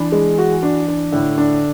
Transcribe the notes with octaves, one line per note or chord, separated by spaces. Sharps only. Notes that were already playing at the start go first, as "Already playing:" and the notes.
Already playing: E3 D4
G#3
F#4
D4
D4
A2 D3
D4